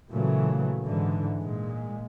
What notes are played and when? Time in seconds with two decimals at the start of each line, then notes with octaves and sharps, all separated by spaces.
0.11 A#2 C#3 E3 F#3 A3
0.86 G#2 D3 E3
1.39 A#2 G#3